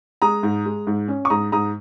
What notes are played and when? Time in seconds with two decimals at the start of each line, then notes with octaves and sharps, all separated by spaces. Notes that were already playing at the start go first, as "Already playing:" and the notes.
0.22 G#3 A#5 D#6
0.43 G#2
0.66 G#3
0.87 G#2
1.08 C#4
1.25 C#6
1.30 G#2 A#5 D#6
1.52 G#2 A#5 D#6